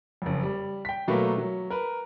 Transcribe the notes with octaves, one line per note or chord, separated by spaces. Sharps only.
F#1 F2
G3
G5 B6
B2 F#3 A3 A#3 B4
F#3
A#4 B4